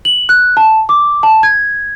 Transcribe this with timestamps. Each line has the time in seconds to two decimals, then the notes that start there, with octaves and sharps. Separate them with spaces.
0.05 F#7
0.29 F#6
0.57 A5
0.89 D6
1.23 A5
1.43 G#6